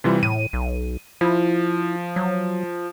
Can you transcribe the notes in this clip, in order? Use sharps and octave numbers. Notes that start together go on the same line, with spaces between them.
C3 E3 G3 F4
A2 D#7
B1
F3 E4
F#3